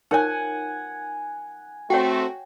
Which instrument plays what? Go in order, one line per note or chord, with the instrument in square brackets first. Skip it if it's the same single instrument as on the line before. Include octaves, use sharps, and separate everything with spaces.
[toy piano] D#4 A#4 C#5 [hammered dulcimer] F#5 G#5
[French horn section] A3 C4 [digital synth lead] F#4 [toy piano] C#5 F#5 G5